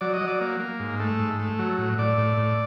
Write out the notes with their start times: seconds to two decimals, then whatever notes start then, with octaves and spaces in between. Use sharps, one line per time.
0.01 F#3 D5
0.14 D#5
0.21 F#3
0.27 D5
0.41 A#3
0.60 A#3
0.80 G#2
1.00 A3
1.19 G#2
1.39 A3
1.59 F#3
1.78 A2
1.98 A2 D5
2.18 A2
2.38 A2